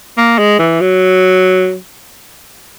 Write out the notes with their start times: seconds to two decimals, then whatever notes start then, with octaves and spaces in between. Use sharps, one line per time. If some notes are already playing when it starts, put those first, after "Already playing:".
0.17 A#3
0.38 G#3
0.59 E3
0.81 F#3